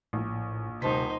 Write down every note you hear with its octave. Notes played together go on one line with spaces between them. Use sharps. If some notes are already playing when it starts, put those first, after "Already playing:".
A#1 A2
D#1 C3 D#4 C5 A5 B6